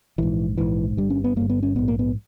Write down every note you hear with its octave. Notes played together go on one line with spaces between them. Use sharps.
A#1 G#2 E3
A#1 G#2 E3
G1 G2 G3
C#4
B3
G1 G2 A#3
B3
C#4
A#1 G#2 B3
A#3
B3